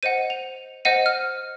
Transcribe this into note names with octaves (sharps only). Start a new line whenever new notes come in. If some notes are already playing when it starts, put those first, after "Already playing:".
C5 D#5 F#5 D#7
F7
C5 D#5 F#5 D#7
F6